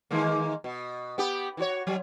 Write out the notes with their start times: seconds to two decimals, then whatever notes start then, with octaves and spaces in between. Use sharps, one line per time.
0.11 D#3 G#3 A#3
0.64 B2
1.18 B3 G4
1.57 E3 F#4 C#5
1.87 F#3